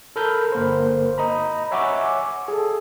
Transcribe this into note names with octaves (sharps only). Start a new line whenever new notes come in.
A4 A#4 B5 F6 G6
G1 A#3 A#4 C5
D#5 A#5 B5
C#5 E5 F#5 G#5 C#6 D6
G#4 A4